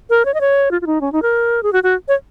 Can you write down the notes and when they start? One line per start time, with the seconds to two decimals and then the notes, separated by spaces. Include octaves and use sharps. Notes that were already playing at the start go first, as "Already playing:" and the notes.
0.10 A#4
0.25 C#5
0.34 D#5
0.41 C#5
0.71 F4
0.82 F4
0.87 D#4
1.01 C#4
1.12 D#4
1.22 A#4
1.63 G#4
1.73 F#4
1.83 F#4
2.08 C#5